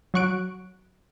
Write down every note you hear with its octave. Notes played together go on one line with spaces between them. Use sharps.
F#3 F#4 C#6 F#6 D7